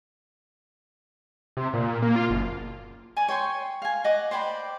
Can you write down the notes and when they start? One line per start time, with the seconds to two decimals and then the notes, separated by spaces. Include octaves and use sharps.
1.57 C3
1.74 A#2
2.02 A#3
2.16 F4
2.30 F#1
3.17 D5 G#5
3.29 C#5 G5 C6 C#6
3.82 F5 G#5
4.04 D#5 F#5 D6
4.31 C5 D5 G5 B5